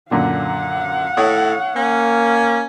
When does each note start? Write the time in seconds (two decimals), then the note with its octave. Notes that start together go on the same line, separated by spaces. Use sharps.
0.11 F#2 A#2 D3 F5 F#5
1.17 A2 C#5 D#6
1.76 A#3 C#4